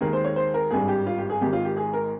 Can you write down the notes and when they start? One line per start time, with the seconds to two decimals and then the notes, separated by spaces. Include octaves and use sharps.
0.01 D#2 D#3 G#3 A#4
0.13 C5
0.25 C#5
0.36 C5
0.54 A#4
0.71 G#1 G2 G3 G#4
0.88 G4
1.07 F4
1.18 G4
1.30 G#4
1.41 G#1 G#2 D#3 G#3 G4
1.53 F4
1.65 G4
1.77 G#4
1.93 A#4